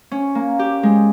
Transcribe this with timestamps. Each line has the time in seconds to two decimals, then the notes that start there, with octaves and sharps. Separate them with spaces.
0.12 C#4
0.35 A#3
0.59 G4
0.83 G#3